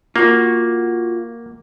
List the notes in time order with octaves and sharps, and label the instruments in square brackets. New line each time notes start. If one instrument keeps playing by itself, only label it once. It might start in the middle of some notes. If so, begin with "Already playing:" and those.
[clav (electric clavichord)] A#3 [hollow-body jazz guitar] F4 F#4